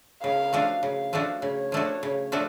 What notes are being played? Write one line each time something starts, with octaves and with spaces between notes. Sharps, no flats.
C#3 F5
F3 A3 D4 F#4
C#3 F5
F3 A3 D4 F#4
C#3 C#5
F3 A3 D4 F#4
C#3
F3 A3 D4 F#4